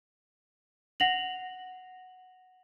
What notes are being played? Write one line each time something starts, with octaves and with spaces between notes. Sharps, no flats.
F#5 A#6 F7 F#7